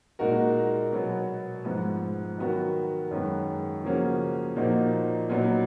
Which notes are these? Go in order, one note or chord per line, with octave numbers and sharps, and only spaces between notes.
A#2 G#3 D#4 F#4 A#4
B2 F#3 B3
G#2 F3 B3
D#3 F#3 B3 F#4 A#4
F#2 D#3 G#3 B3
C#3 F3 A#3 C#4 F#4
A#2 F3 A#3 D#4 F#4
A#2 F#3 B3 D#4